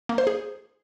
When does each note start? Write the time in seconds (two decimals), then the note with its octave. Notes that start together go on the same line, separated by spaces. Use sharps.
0.09 A#3
0.18 C5
0.27 G#4